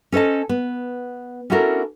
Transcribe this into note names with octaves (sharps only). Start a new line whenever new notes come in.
C#4 A4 C5 D#5 A5
B3
C#4 D4 E4 F#4 A4 A#4